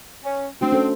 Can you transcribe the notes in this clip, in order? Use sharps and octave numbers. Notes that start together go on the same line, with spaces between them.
C#4
A3 C4 D4 F#4
C#4 A4 C5